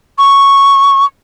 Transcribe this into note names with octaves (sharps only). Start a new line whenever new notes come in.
C#6